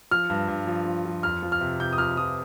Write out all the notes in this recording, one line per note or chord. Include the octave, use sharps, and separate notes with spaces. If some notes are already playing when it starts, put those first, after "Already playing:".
F3 F6
G2
G2
F3
F3
F3
F2 F6
F3
F6
C3
C3 G6
D#6
F2 F6
F3 D#6